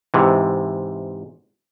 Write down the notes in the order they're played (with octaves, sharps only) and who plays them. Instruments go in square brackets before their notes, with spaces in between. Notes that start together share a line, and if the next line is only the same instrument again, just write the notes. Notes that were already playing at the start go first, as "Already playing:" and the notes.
[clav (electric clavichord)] G#2 C3 E3